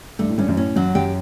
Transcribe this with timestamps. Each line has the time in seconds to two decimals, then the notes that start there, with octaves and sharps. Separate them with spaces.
0.19 G2 A3
0.29 A2
0.38 G2 C#4
0.48 F#2
0.57 A2 C#4
0.76 F#2 F#3
0.95 F#2 G4